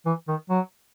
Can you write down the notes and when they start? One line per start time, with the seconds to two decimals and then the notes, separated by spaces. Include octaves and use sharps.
0.06 E3
0.28 D#3
0.50 F#3